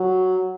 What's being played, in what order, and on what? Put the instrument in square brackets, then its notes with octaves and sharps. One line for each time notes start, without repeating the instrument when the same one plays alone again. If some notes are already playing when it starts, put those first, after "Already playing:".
Already playing: [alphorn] F#3